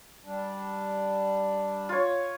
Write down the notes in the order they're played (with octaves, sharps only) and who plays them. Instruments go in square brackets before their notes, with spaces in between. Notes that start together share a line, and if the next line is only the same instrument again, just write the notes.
[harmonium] G3 D4
[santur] F4 C#5